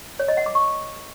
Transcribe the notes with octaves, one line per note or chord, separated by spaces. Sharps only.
C#5
D#5
F#5
D6
C#6